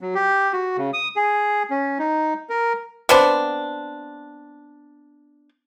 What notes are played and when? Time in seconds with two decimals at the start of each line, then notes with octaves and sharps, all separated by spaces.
0.01 F#3
0.15 G4
0.53 F#4
0.77 C#3
0.93 D#6
1.16 G#4
1.70 C#4
1.99 D#4
2.50 A#4
3.09 B3 C4 D4